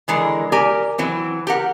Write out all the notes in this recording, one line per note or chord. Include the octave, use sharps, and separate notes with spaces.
D3 E3 G#3 A#4
G4 A#4 D5 G#5
E3 F#3 C4
G4 A#4 F#5